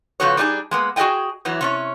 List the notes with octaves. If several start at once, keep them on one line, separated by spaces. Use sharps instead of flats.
C#3 F3 B3 F#4 A4 C#5
G3 D4 D#4 G4 G#4
G#3 A#3 B3
F#4 G#4 B4 D#5 G5 G#5
E2 E3 F#3
C3 C#4 C#5